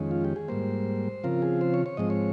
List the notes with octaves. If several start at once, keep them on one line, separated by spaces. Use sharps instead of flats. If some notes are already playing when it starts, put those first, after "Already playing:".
Already playing: F2 D#3 G#3 C#4
F4
G4
G#4
G#2 G3 A#3 C5
C#3 F3 C4 F4 A#4
G#4
C5
C#5
C#5
G#2 F3 G#3 C4 D#5
C#5